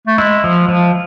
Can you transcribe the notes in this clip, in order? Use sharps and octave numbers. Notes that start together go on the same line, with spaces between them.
A3
G#3 E4
F3
F3